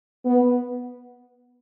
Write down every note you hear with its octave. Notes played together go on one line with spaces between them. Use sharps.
B3